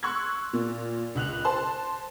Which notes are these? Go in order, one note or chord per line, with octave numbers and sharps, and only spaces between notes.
C6 C#6 E6 F#6 G#6
A#2
C#2 F#6 F7
C5 A5 C6